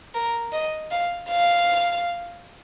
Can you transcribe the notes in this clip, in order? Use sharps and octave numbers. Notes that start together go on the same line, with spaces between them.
A#4
D#5
F5
F5